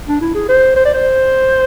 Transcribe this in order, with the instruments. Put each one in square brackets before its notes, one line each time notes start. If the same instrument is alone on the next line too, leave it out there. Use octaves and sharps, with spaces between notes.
[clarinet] D4
E4
G#4
C5
C5
D5
C5